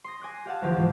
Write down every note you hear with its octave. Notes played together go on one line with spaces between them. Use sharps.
C6 D#6 A#6
G#5 D6 F#6 A#6
G4 F5 F#5 A5
D2 E3 F3 G4 F5
G#2 F3